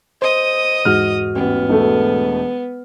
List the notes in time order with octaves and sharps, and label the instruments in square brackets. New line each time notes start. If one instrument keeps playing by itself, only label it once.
[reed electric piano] C5 [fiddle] D#5 D#6
[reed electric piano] E2 G#2 F#4 [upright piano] F6
[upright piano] A1 [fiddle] B3
[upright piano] E1 A3